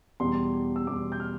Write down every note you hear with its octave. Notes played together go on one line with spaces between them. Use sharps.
E2 B2 G3 C6
E6
E2 B2 G3 D6
G6
F6